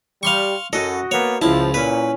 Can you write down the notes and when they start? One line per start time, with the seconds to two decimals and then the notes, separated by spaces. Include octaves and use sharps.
0.23 G3 F5 C6 C#6
0.73 F#2 F#4 A4 D#5
1.11 A#3 B3 C#5
1.42 C#2 F3 E4 A5
1.74 A#2 C#4 B4 B5